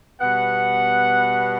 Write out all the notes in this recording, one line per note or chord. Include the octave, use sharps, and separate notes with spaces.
B2 G3 B3 F#5